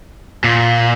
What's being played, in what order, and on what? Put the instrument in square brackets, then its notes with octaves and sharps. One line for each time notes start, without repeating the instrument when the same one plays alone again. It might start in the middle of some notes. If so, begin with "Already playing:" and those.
[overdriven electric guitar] A#2